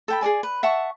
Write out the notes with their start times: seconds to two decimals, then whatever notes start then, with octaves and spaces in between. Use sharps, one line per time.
0.08 A4 G5 B5
0.21 G#4 A4 D5 G#5
0.43 B4
0.63 E5 F#5 A5 C#6